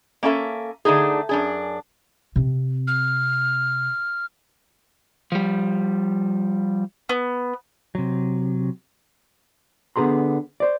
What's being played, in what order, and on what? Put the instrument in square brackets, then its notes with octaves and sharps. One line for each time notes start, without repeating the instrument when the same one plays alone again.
[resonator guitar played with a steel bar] A#3 C#4 D4 A4 E5
D3 A3 D4 D#4 G#4
F#2 D4 G#4
[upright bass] C3 C4
[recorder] F6
[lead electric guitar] F3 G3
[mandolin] B3
[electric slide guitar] C3 F#3
[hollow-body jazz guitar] D3 B3 G#4 A#5 C6
C5 D5